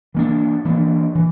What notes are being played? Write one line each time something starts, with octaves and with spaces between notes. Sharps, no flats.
E3 A#3 D4
E3 A#3 D4
E3